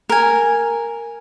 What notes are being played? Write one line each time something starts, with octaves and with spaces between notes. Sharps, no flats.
A#4 G#5